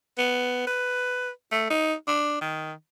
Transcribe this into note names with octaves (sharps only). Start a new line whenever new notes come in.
B3
B4
A3
D#4
D4
D#3